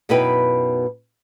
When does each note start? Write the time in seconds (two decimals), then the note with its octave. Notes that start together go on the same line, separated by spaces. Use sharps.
0.09 F#2 B2 D#4 E4 B4 G5